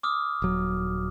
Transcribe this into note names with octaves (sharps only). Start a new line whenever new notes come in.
D6 D#6 F6
D#1 F#3